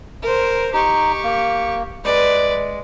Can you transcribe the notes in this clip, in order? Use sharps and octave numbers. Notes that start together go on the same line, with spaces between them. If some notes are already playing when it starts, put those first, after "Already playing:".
A#4 C5
D#4 G4 C#6
A#3
G#3 B4 D5